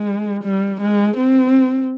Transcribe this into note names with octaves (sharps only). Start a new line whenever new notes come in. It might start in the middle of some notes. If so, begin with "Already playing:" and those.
Already playing: G#3
G3
G#3
C4